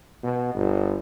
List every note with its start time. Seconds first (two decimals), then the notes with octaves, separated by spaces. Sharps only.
0.23 B2
0.54 G1